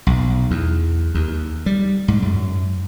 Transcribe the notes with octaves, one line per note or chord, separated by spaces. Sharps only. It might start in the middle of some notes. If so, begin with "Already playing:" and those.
B1
E2
D#2
G3
G#2
F#2